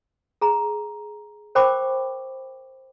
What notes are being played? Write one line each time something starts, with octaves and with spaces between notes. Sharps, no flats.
G#4 A#5
A#4 C5 G5 B5 C#6 D6